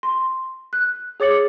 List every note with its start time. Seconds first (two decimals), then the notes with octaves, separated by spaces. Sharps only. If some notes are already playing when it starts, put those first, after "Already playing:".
0.03 C6
0.73 F#6
1.20 G#4 C#5 D6 A6 C#7 F#7